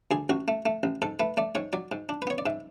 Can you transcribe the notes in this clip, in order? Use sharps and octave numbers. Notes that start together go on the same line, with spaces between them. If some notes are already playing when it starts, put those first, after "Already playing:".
D2 G#4
A1 F#4
A3
A3
A1
G#2 A4
A3 B4
A3 D5
G#2 C#5
F#3 D5
G#2
D4
B4
B3 C#5
D5
G#2 E5